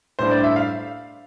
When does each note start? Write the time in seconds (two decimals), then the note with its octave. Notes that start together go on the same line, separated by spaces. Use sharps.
0.19 A2 G3 D4 C5
0.31 D5
0.43 E5
0.56 F5